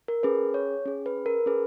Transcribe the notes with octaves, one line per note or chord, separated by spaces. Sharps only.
A#4
C#4 G#4 B4
C#5
C#4 G#4
B4
A#4
C#4 G#4 B4